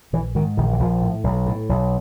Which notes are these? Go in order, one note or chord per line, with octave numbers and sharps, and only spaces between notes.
A#1 E3
G#2 D#3
A#1 D#3
E3
A#1 F3
A2
B1
A2
B1